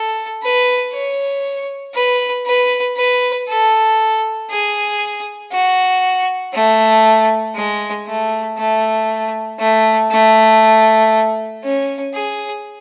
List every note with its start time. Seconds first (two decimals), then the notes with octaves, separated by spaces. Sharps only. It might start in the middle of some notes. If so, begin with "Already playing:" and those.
Already playing: A4
0.43 B4
0.93 C#5
1.95 B4
2.46 B4
2.97 B4
3.48 A4
4.50 G#4
5.53 F#4
6.54 A3
7.55 G#3
8.07 A3
8.57 A3
9.59 A3
10.11 A3
11.63 C#4
12.14 G#4